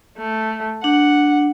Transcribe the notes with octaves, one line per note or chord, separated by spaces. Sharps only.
A3
D4 F#5